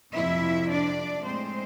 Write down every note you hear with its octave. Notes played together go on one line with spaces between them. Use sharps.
F2 C3 F3 E4 E5
D4 D5
A2 G#3 C4 C5